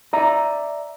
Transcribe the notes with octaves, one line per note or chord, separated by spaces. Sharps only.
D5 E5 A#5